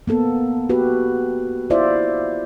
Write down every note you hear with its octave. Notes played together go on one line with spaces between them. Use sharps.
A#3 B3 A4
F#4 G4 B4
E4 F4 C5 D5 E5